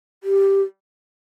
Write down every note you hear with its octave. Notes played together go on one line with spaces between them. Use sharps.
G4